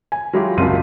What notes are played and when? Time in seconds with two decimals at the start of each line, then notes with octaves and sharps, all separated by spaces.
0.12 G#5
0.33 F#3 G#3 E4 F4 G4
0.57 F#1 C2 F#2 F4 G4 D#7